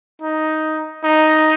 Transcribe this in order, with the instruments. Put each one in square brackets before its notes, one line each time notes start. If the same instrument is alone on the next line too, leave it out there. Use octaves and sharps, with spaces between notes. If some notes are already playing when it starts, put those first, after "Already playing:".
[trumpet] D#4
D#4